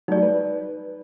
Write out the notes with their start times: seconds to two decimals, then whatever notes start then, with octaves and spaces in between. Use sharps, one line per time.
0.08 F#3 G3 A3 D#4 D5
0.22 B4